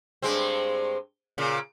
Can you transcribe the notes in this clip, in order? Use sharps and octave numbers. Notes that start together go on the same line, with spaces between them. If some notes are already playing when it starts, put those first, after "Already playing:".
G2 G#3 C4
A#2 C#3